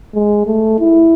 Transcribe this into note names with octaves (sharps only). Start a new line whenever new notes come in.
G#3
A3
E4